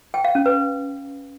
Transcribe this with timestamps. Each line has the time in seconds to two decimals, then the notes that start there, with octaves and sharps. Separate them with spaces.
0.14 G5
0.25 F5
0.35 C#4
0.46 B4